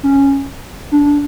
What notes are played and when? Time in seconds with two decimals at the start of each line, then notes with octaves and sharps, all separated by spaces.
0.03 C#4
0.92 D4